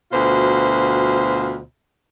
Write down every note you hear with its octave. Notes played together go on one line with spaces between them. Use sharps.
D2 B2 F4 C5